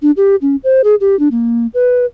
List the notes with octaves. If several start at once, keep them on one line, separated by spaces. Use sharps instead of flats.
D4
G4
C#4
C5
G#4
G4
D4
A#3
B4